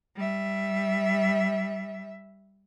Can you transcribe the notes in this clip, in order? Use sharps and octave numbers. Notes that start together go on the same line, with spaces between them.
G3 E5